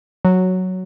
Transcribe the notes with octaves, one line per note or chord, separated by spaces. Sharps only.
F#3